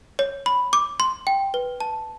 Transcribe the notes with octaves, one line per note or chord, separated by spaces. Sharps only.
C#5
B5
D6
C6
G5
B4
A5